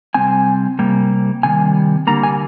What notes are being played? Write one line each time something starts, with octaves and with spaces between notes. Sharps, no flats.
C3 G3 C4 G#5
C3 G3 A#3
C3 D#3 G3 G#5
D3 G3 A#3 A#5
G#5